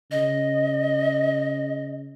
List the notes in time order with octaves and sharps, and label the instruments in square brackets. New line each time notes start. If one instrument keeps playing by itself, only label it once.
[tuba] C#3 [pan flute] D#5